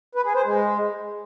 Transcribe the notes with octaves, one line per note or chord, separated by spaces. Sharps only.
B4
G#4
C5
G#3